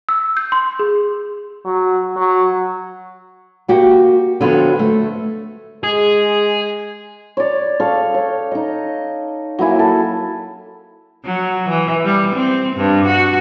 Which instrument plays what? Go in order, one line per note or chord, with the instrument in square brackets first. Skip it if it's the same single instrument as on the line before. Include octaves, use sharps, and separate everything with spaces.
[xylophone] E6
G6
C6
G#4
[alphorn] F#3
F#3
[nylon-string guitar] A#3 F#4 G4
D3 F3 F#3 B3 C4 F#4
A3
[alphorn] G#3 [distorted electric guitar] G#4
[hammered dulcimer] C#5 D5
A4 F5 C#6
C#5 G5
D#4 D#5
F#3 A#3 E4 G#5
A4
[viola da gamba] F#3
E3
G3
C4
G2
F#4